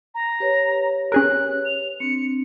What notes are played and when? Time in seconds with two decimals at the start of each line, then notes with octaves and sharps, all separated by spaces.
0.15 A#5
0.40 G4 B4 C#5
1.12 C#4 G#4 A#4 F#6
1.65 F7
2.00 C4 D4 C#7